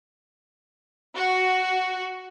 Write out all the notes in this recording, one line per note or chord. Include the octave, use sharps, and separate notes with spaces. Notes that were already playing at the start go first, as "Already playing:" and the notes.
F#4